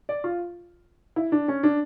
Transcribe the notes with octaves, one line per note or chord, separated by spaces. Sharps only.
D5
F4
E4
D4
C#4
D4